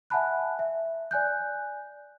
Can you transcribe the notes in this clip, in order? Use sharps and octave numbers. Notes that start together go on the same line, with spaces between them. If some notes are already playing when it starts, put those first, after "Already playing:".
E5 F#5 G#5 A5 B5 F#6
E5
D5 G#5 F#6 G6